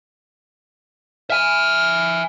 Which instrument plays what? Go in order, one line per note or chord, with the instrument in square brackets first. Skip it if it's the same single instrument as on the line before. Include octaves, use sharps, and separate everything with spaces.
[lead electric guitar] E5 G#5 [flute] F6